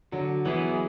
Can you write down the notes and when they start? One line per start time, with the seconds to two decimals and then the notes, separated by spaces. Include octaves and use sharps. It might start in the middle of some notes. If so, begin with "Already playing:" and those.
0.12 D3 F#3
0.45 E3 F#3 B3 E4 G#4
0.72 G#3